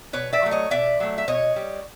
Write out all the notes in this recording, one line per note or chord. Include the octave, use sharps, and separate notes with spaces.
B2 B4 C#5
D5 E5
F#3 A3
C#5 D#5
B2 D5 E5
F#3 A3
E5
B2 C#5 D#5
G3